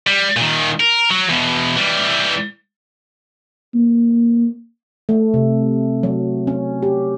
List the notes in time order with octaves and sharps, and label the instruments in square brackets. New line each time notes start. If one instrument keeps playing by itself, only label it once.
[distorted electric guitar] G3
A#2 D#3
A#4
F#3
E2 B2
E3 G3
[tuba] A#3
[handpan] A3
C3
F#3
C#4
G4